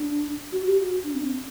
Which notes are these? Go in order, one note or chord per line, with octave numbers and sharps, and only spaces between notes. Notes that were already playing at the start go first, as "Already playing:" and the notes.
Already playing: D4
F#4
G4
F#4
D4
C4
D4
C4